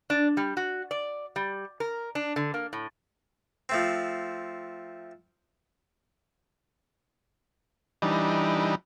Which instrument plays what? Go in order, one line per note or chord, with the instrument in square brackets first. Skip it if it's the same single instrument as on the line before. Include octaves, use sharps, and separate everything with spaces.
[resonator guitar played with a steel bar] D4
G3
F#4
D5
G3
A#4
D4
D3
A#3
A2
[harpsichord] F3 A3 C4
[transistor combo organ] E3 G3 D4 D#4